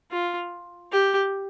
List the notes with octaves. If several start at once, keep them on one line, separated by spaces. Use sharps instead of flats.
F4
G4